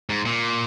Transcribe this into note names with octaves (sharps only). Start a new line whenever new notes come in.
G#2
A#2